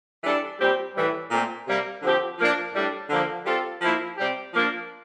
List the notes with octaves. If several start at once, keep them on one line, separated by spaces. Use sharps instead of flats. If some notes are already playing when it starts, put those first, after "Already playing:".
E3 G3 D4 A4
A#2 G3 C4 G4
A2 E3 G3
A#2 A3 C4
C3 G3 A#3
D3 F3 C4 G4
F3 A#3 D4
A2 G3 D4
D3 F3 A#3
G3 C4 F4 A4
F3 A#3 E4
C3 G3 C4 G4
F3 A#3 D4